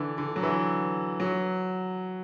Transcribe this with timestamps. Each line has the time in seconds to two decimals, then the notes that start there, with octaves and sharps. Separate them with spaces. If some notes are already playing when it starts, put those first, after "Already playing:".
Already playing: D3 E3
0.18 D3
0.36 F#3
0.43 E3
1.20 F#3